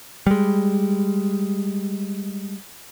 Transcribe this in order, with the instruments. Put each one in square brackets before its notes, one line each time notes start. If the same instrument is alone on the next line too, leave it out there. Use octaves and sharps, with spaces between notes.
[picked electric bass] G3 G#3